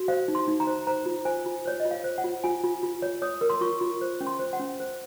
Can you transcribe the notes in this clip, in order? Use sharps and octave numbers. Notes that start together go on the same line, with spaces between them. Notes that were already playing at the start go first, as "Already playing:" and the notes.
Already playing: F#4
C5 F5
D#4
C6
D#4
A#5
C5
C5 A#5
F4
C5 G#5
F4
C5 C#5
D#5
F4
F5
C5
F#5
F4
F4 G#5
F4
F4
C#5
C#5 D#6
A#4
C6
F4 C#6
F4
C5
C#4
C6
C5
F#5
C#4
C5